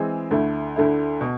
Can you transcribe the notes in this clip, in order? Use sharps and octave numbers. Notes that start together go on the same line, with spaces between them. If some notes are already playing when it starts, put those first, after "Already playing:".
Already playing: E3 G#3 C4 G#4
D2 D3 A3 E4
D2 D3 A3 E4
B2